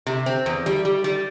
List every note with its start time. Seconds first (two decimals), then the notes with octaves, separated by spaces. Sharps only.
0.07 C3
0.26 C4
0.46 E2
0.66 G3
0.85 G3
1.04 G3